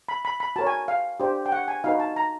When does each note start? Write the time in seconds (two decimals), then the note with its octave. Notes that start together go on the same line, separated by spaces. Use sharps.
0.09 B5
0.25 B5
0.40 B5
0.56 F#4 A#4 C#5 A5
0.67 G#5
0.88 F5
1.20 D4 G4 C5
1.46 G5
1.52 F#5
1.68 G#5
1.84 D#4 F#4 B4 F5
2.00 A5
2.16 A#5